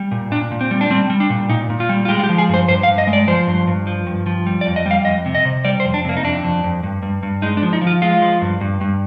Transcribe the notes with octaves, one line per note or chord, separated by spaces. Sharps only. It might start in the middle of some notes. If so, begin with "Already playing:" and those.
Already playing: G3
A#2
A#2 D4
A#2
C4
G3
D4
G3 C4
G3
D4
A#2
A#2 D#4
A#2
F4
G3
F4
G#3 G4
F4
G4
F3
G#4
G2 C5
G2 C5
F5
G2
D#5
G#3
D5
F3 C5
G2
G2
F3
G2
F3
G3
D5
F2
D#5
G3
F5
F2 D#5
C3
D#5
C3
G3 D5
C5
F2
D4
C3 A#3
D#4
F2 D4
F2
F2
G2
G2
G2
G#3 D#4
D4
F3
D#4
F3
F4
G#3 F4
F3
G2
G2
G2